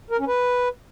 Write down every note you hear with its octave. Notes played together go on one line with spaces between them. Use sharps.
A#4
C#4
B4